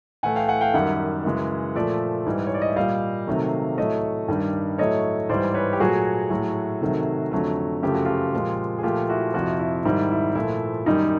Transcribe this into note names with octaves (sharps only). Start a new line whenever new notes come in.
A2 E3 A3 F#5 G#5
F5 G5
F#5 G#5
F5 G5
F#2 D#3 G3 E5 F#5
F#2 C#3 E3 G#3
A#2 F3 A3 D5 E5
G#2 E3 G3
C#5
D5
D#5
E5
A#2 G3 D#5 F5
C3 D#3 F#3 A3
A2 F#3 A3 C#5 D#5
G2 D#3 G3
A2 F#3 A3 C#5 D#5
G#2 E3 G3 C5 D5
B4 C#5
G4
A#2 F#3 A3 F#4 G#4
A2 F#3 A3
C3 D#3 F#3 A3
F2 D3 F#3 A3
F#2 C#3 F3 A3 G4
F#4
F4 G4
A#2 F3 G#3
G#4
A#2 F3 A3 F4 G4
E4 F#4
F2 C3 F3 E4 F#4
E4
G#2 D#3 G3 E4
E4
A#2 F3 A3 E4
F#2 D#3 G3 D#4